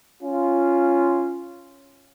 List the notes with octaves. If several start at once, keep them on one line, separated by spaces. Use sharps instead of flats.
C#4 F4